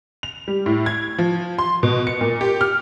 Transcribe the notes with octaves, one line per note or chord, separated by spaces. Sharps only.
F7
G3
A2
G#6
F3
C6
B2
C#7
A#2
G4
F6